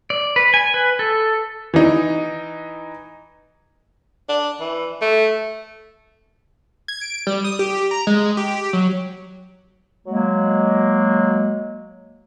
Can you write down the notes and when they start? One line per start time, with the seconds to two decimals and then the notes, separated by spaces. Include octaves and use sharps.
0.10 D5
0.36 B4
0.54 G#5
0.74 B4
0.99 A4
1.74 E3 D#4
4.29 D4
4.60 E3
5.01 A3
6.88 G#6
7.01 D7
7.27 G3
7.44 D#6
7.59 G4
7.91 A#5
8.07 G#3
8.37 G4
8.73 F#3
10.07 F#3 G#3 A#3